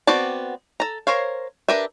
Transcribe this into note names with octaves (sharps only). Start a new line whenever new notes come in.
B3 C4 F#4 D5 A5
A4 A#5
A#4 C5 C#5 F5
D4 G4 A#4 B4 E5